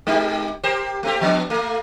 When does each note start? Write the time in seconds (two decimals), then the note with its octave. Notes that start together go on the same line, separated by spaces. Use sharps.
0.07 G#3 D#4 G4
0.63 G4 A#4 C5
1.03 A3 C4 G4
1.21 F3 B3 D4
1.50 A3 A#3